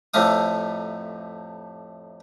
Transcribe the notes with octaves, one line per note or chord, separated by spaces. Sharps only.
F2 A2 C3 A3 F5 D#6